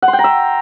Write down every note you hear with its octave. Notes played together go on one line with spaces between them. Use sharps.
F#5
C6
G5
A#5
E5